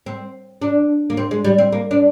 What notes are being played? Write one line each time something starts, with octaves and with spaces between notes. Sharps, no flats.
C4
D4
A#3
C4
G#3
G3
C4
A#3
D4